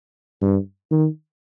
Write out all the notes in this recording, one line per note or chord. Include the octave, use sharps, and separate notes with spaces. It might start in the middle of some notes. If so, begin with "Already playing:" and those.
G2
D#3